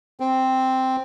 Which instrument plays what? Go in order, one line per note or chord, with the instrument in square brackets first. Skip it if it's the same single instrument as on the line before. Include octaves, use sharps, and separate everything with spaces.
[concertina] C4